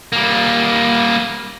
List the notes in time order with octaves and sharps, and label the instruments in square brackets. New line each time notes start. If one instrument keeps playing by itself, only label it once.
[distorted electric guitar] G3 A#3